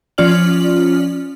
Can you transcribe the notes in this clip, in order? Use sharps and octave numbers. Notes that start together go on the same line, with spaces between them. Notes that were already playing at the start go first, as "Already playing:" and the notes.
F3 C#4 F4 D5 F6 F#7